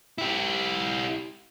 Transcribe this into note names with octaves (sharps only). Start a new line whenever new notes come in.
E4 G4